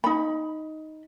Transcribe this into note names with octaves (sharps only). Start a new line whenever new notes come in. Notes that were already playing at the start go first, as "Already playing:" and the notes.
D#4 B5